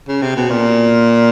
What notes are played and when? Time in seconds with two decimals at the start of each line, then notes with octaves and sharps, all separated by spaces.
0.08 C#3
0.22 C3
0.36 B2
0.50 A#2